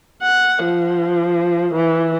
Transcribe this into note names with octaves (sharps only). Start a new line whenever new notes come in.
F#5
F3
E3